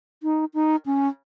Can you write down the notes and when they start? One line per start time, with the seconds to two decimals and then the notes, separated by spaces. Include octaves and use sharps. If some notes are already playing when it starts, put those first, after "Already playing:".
0.23 D#4
0.54 D#4
0.86 C#4